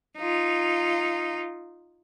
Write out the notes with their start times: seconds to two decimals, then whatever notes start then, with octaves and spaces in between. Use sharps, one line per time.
0.18 D#4 F4